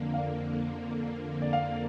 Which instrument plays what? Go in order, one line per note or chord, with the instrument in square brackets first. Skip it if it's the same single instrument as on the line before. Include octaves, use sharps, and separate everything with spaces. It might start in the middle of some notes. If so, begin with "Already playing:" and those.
Already playing: [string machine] F2 D3 A#3
[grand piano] F5
D5
D5
F5